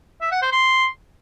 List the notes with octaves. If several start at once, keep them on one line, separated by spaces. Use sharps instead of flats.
E5
F#5
C5
C6